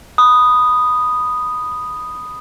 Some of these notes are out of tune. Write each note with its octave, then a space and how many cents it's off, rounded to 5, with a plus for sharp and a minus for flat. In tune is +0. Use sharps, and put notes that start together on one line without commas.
B5 +5 D#6 -5